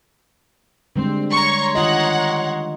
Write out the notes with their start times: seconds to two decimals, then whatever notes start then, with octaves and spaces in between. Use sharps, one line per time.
0.96 D3 G3 G#3 C4
1.32 C#5 A#5 C6 C#6
1.75 D#3 F4 D#5 F#5